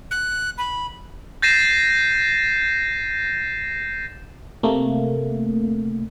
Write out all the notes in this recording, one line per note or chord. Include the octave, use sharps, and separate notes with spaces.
F#6
B5
G6 A6 A#6 C7 D#7 E7
C3 A3 A#3